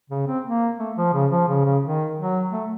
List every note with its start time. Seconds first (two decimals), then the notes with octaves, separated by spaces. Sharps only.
0.10 C#3
0.27 C4
0.44 A#3
0.79 A3
0.96 F3
1.13 C#3
1.31 F3
1.48 C#3
1.65 C#3
1.83 D#3
2.18 F#3
2.52 A3